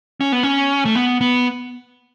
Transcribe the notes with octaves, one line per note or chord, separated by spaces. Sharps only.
C#4
B3
C#4
A3
B3
B3